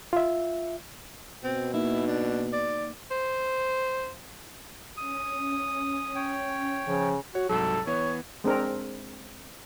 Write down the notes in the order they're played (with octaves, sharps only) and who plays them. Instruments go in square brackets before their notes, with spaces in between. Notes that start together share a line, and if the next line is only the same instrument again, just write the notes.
[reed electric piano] F4 E5
[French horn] B2 [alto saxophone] C4
[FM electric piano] A#3 D#4 [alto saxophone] E4
[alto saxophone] D4
D5
C5
[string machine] C#4 [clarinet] D#6
[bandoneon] C#5 G5
[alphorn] C#3 [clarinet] F3
[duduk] F#4 [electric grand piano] C#5
[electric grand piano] C2 G#2 F#3 [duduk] A4
[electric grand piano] E3 B3 [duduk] C#5
[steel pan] G#3 C4 D4 A#4